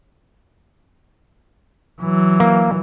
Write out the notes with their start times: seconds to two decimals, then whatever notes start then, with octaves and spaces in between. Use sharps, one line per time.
2.02 E3 F#3
2.40 A#3